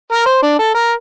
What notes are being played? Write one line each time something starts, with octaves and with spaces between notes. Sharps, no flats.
A#4
C5
D4
A4
A#4